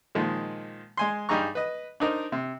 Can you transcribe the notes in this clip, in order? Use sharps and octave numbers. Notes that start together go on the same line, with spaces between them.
A#2 D#3 F3 G#3
G#3 G#5 C6
G2 G3 D#4 G#4 A#5 C#6
B4 D#5
D4 D#4 A#4 C5
C3